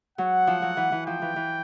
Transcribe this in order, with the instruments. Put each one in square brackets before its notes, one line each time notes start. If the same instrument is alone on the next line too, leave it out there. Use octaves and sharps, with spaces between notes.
[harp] F#3 [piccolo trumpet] F#5
[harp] F3
F#3
E3
E3
[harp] F3 [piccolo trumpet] G5
[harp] E3
E3